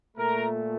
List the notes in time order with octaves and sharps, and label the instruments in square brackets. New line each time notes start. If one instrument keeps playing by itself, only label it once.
[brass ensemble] A#2 A3 A#4